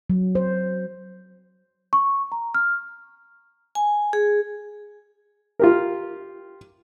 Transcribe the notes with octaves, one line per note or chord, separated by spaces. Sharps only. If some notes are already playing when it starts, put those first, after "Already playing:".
F#3
C5
C#6
A#5
F6
G#5
G#4
F4 G4 A#4